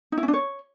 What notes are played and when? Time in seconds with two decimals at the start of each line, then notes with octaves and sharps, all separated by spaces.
0.12 D#4
0.18 E4
0.23 C#4
0.28 D4
0.34 C#5